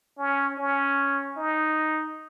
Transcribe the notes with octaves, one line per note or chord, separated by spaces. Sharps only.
C#4
C#4
D#4